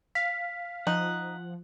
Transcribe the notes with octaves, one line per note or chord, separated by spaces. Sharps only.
F5 B6
F3 D#4 F#5